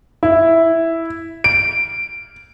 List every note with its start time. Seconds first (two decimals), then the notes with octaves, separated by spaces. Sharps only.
0.23 E4
1.44 D7